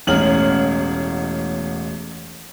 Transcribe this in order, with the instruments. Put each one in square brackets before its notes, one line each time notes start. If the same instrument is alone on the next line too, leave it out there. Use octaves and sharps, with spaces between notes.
[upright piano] E1 A1 C#4 F6 F#7